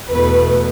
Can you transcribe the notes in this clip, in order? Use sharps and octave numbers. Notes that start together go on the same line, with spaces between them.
E2 B2 A3 B4